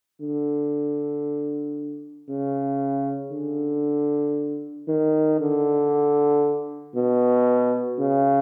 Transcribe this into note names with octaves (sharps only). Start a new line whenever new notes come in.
D3
C#3
D3
D#3
D3
B2
C#3